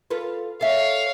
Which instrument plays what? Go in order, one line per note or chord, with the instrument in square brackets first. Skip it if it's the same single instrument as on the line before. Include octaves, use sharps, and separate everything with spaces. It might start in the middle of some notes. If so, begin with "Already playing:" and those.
[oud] F4 A4 B4
[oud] A4 E5 [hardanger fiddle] C#5 F5